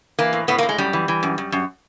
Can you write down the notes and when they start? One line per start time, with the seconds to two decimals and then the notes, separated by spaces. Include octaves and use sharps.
0.19 E3 A#3
0.33 A2
0.48 A2 B3
0.58 A#3
0.63 A2
0.69 G#3
0.78 F#2 G3
0.93 E3
1.08 E3
1.23 F#2
1.38 F#2
1.52 F#2